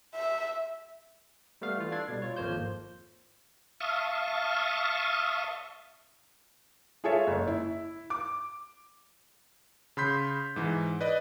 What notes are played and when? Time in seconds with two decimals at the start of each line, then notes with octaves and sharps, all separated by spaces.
0.15 E5
1.61 G3 A3 B3 F5
1.78 E3 F4
1.92 D4 A4 G#6 A6 C7
2.09 B2 G3
2.22 F4 C#5
2.36 G#1 F2 F3 A#3 C5 G6
3.80 E5 F5 A5 C#6 D#6
7.04 F4 G#4 A4 C#5 E5
7.27 F#1
7.48 E4
8.10 D6
9.97 C#3 B5 C6 G6 B6
10.56 G#2 E3
11.01 B4 D5 D#5